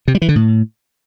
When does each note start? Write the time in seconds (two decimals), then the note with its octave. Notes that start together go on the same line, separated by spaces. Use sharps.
0.08 C3
0.15 G3
0.22 E3
0.29 D3
0.36 A2